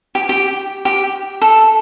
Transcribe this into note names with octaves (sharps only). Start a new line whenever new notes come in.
G4
G4
G4
A4